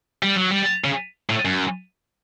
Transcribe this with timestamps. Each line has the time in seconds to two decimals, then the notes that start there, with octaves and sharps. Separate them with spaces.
0.23 G3
0.36 F#3
0.50 G3
0.84 C#3
1.30 A2
1.45 F#2